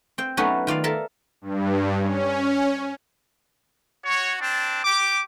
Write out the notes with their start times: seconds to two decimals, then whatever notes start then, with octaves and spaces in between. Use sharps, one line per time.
0.18 C4 G5
0.37 F#3 A3 B3 C#4 D#4 F#4
0.67 D#3 F4 D5 F5
0.84 A4 A#4 E5 A5
1.41 G2
2.00 C#4
4.05 F#4 C#5
4.41 C4 D4 A5
4.85 G4 D6